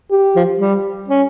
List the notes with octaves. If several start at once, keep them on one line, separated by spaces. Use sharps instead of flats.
G4
F3
G3
C#4